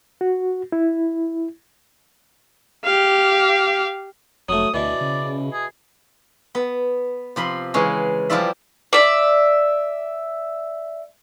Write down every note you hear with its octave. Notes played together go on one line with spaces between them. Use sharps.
F#4
E4
G4 F5
F1 F#3 A3 D#6
D2 B2 E3 D5
C#3
G#4
B3
C3 F3 B5 C6
C#3 E3 G#3 C#4
F3 G3 E4 F4 D5 E5
D5 E5